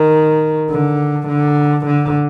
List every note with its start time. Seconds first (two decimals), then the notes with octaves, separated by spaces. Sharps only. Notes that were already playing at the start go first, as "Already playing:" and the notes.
Already playing: D#3
0.70 D3
1.28 D3
1.86 D3